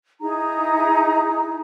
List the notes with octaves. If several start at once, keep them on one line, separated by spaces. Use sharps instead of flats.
D#4 E4 G#4 A#5